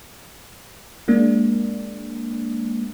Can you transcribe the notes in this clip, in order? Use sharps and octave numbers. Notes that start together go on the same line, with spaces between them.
G#3 A#3 D4